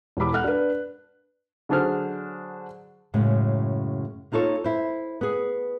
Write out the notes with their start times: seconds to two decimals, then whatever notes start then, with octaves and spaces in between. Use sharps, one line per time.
0.17 E1 E2 G4 B5 D6
0.32 A4 F#5 F6 F#6
0.44 D4 B4
1.69 D3 F#3 D4 G#4 C5 F6
3.14 F#2 A2 C#3 G#3
4.32 A#3 D#4 F4 A4 C#5
4.64 E4 C5
5.21 B3 G#4